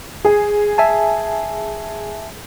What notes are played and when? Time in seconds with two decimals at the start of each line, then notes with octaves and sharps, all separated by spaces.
0.25 G#4
0.78 E5 G#5 A5